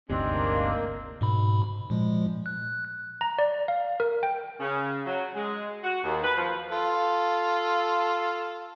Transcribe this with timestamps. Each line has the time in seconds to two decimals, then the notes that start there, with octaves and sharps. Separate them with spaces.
0.10 G1 D2 C3 G#3 C4 D4 D#4
0.33 A#3
1.21 G#2 B2 B5
1.90 A#2 F3 G#3
2.46 F#6
3.21 A#5
3.39 D5
3.68 F5
4.00 A#4
4.23 G5
4.60 C#3
5.06 F#3
5.35 G#3
5.84 F#4
6.04 D#2
6.24 B4
6.36 F3
6.71 F4 A4